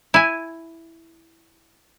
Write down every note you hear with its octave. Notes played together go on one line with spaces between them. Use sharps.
E4 G#5